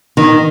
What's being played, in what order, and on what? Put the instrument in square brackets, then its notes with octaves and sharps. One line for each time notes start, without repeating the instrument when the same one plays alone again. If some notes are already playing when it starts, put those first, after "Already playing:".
[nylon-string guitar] D#3